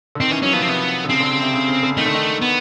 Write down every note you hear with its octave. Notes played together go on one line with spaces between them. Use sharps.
D3
D#3 C4
E3 C#4
F#3 C#4
F3 B3
C4
C3 B3
D3
C#3 C4
D3
C#3
C3
C#3
C#3
D3
D#3 A3
D3
D#3
B3